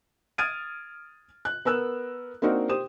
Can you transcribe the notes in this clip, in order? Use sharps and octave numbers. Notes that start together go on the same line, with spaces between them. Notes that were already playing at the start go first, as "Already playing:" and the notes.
D#6 F6 G#6 A6 D7 D#7
F#6
B3 A#4 E6 F#6 E7
A#3 C4 D4 D#4 F#4 A#4
G4 C5 D#6 E7